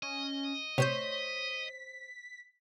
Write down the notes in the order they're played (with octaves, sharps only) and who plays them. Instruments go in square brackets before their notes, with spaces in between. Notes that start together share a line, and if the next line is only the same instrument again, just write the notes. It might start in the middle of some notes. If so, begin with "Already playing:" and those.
[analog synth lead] C#4 [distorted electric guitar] D#5
[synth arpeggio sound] C3 G6 [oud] C5 C#5 [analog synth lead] B6